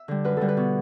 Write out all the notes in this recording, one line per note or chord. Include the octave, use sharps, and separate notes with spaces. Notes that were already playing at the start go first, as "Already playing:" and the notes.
Already playing: E5
D3 G3
F#2 B4
D3 G3 A4
B4
B2